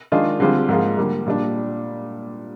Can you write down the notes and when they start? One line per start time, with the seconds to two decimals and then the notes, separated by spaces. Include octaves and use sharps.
0.12 D#3 G#3 D4 F4 G#4
0.40 D3 G3 C4 F4 G#4
0.69 G#2 F3 A#3 F4 G#4
0.97 D3 G3 A#3
1.26 A#2 G3 D4